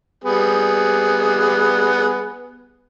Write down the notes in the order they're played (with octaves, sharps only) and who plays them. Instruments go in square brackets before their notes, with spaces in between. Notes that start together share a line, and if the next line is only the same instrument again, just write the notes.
[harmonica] G3 B3 G#4